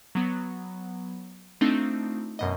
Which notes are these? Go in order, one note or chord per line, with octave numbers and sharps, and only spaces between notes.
F#3 B3
A3 C4 D4 D#4 F4
F#2 B2 D#5